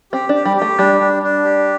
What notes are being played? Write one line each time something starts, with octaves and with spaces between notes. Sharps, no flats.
C4 G4
D4 G4
G3
A3 G4
G3 D4
D4
D4
G4